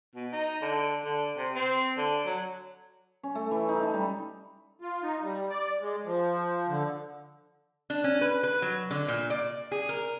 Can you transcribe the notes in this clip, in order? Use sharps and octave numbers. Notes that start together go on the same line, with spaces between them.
B2
D#4
D3
D3
C3
C4
D3
F#3
C#4
A3
E3
D#4
A5
G3
F4
D#4
G3
D5
G#3
F3
D3
D4
C#4
B4
B4
F#3
D3
A#2
D5
G#4
A#4